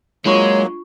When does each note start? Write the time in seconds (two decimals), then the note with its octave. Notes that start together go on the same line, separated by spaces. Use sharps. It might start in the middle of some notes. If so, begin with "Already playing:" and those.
0.25 F#3 G#3 A#3 D4 F4 C#5 C#6